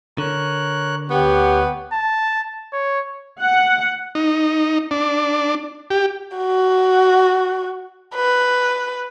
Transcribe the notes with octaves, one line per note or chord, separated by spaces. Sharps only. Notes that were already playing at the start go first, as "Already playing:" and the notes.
D3 A#4 C#5 F#6
D2 B3 G4 C#5 F#5
A5
C#5
F#5
D#4
D4
G4
F#4
B4